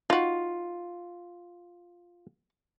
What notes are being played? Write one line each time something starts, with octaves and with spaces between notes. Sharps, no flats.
D#4 F4 F#4